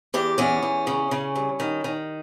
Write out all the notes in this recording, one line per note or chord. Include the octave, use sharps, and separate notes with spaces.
E2 G4
E2 C#4
E2
C#3
C#3
G2
D#3
D#3